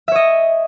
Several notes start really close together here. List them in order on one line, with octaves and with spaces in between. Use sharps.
E5 C#5 D#5